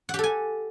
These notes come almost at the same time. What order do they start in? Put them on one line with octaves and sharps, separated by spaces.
F#5 G4 A4 G#5